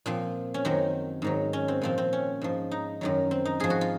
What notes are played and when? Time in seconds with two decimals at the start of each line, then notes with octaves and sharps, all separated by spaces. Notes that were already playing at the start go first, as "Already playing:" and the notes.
0.06 A#2 F3 C4
0.54 C#4
0.65 F#2 D#3 F#3 C4
1.22 G#2 D#3 F#3
1.53 C#4
1.68 C4
1.82 A#2 F3 C4
1.98 C4
2.13 C#4
2.41 G#2 F3
2.71 D#4
3.01 F#2 D#3 F#3
3.31 C4
3.45 D#4
3.60 G#2 F3 G#4
3.70 F#4
3.81 F4